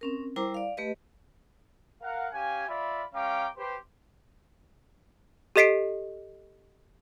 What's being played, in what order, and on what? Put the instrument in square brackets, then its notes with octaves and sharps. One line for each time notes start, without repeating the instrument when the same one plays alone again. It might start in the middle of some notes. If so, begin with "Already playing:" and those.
[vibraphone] C4 C#4 A#4
G3 E4 A#4 C5 A#5 D6
D5 F5
A3 G4 B4 D#5
[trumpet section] A#4 F5 F#5
C#4 G4 F5 G#5
F4 D5 E5 F5 B5
G#3 C#4 F5 G5 A#5 D6
G4 B4 C5
[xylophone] G4 A4 D#5 B6 C7 D7